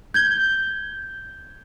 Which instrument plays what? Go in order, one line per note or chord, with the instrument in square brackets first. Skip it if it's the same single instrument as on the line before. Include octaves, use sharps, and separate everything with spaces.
[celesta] G6 G#6 G7